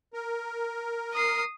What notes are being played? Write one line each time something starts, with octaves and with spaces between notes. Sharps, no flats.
A#4
D#6 C7